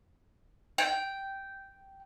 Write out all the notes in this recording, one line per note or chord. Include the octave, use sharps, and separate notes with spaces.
G5